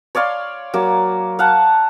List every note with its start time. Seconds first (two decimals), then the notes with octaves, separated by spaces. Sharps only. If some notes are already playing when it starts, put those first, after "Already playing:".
0.15 C#5 D5 F5 C6
0.74 F#3 A#3 D6
1.39 F5 F#5 A5